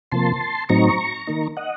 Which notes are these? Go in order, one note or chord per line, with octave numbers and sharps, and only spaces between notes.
C3 F3 A#3 A5 C6
A2 F#3 C4 D#4 A#5 C#6
D#3 A#3 D#4
D#5 F#5